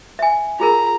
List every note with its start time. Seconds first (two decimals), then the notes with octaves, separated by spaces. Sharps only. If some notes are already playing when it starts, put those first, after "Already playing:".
0.19 E5 G#5
0.60 F4 G#4 A#4 A#5